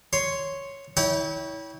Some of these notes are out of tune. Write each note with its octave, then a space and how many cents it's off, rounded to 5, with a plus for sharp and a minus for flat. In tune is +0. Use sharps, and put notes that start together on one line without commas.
C#5 +0 C6 +0
E4 -30 C#5 +30 G5 -10